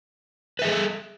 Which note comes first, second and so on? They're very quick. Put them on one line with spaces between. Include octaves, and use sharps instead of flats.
B4 E5 G#4 A4